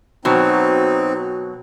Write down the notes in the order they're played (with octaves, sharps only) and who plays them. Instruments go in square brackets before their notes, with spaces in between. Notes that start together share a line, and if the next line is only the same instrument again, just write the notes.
[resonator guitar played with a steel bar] B2 F#3 [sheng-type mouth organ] C4 D#4